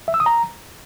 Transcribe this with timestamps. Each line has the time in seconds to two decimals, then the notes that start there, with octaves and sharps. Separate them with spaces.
0.08 E5
0.14 E6
0.20 D#6
0.26 A#5